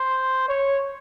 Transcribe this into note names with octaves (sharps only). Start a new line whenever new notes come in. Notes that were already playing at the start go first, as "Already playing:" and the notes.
Already playing: C5
C#5